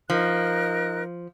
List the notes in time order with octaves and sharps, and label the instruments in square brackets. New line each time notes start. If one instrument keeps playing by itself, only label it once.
[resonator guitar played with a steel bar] F3 [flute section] D#4 A#4 F#6